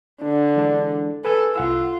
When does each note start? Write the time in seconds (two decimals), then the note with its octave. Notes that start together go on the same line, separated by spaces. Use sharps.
0.22 D3 D4
0.56 E3 G#3 D4
1.25 A4 B4 G#5 E6
1.56 C2 F4 F#5 E6